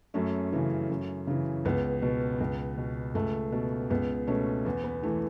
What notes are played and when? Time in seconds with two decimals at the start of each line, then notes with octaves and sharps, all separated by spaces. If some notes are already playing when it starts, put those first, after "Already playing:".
0.14 F#2 A3 C#4
0.53 C#3 E3
0.89 F#2
1.27 C#3 E3
1.65 C#2 B3
2.02 B2
2.40 C#2
2.78 B2
3.15 C#2 A3
3.52 B2
3.90 C#2 B3
4.27 B2 A3 C#4
4.65 E2 B3
4.84 B3
5.03 E3 A3